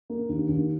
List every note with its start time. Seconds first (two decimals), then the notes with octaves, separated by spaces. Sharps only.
0.10 A#3
0.29 D#2
0.49 D#2